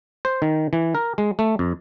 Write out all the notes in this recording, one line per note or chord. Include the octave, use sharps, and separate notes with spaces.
C5
D#3
E3
A#4
G#3
A3
F2